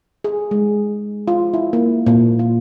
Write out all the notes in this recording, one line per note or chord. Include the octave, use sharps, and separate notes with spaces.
G#4
G#3
F4
E4
A#3
A#2
F4